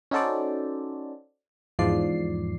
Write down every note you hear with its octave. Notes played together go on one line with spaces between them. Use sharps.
C#4 D#4 F#4 A4 C5 D5
E2 G#2 F3 D5 C7